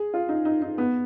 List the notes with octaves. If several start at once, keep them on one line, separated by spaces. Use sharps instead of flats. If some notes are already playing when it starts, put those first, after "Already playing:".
Already playing: G#4
F4
D#4
D#4
D#4
B3